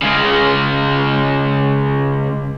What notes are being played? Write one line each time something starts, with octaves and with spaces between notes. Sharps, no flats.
C#3 G#3